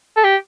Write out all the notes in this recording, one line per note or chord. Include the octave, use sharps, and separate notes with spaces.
A4
G4